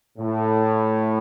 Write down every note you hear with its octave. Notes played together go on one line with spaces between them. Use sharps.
A2